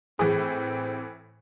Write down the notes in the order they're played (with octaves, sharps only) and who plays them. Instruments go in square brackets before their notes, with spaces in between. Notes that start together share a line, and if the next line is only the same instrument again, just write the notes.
[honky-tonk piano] A2 E3 [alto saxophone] C4 [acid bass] G#4